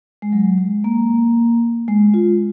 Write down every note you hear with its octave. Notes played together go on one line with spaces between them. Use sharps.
G#3
F#3
G#3
A#3
G#3
F4